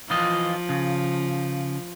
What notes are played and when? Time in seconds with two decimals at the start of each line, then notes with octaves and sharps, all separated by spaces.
0.10 E3 F3 F4 D#5
0.69 C#3